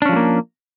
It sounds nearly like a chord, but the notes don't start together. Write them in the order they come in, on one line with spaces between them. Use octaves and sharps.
D4 C#4 F3 G#3 A#3